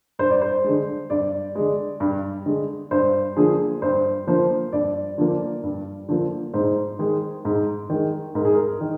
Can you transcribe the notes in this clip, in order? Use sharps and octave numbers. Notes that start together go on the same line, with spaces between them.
G2 C5
D5
C5
D3 G#3
G2 D5
D3 G#3
G2
D3 G#3
G2 C5
D3 F3 A#3 G#4
G2 C5
D3 F3 A#3 C5
G2 D5
D3 F3 A#3
G2
D3 F3 A#3
G#2 C5
D#3 G#3
G#2
D#3 G#3
G#2 A#4
G#4
A#4
D#3